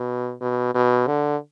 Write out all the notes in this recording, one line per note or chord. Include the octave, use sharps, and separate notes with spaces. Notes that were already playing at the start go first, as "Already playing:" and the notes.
Already playing: B2
B2
B2
D3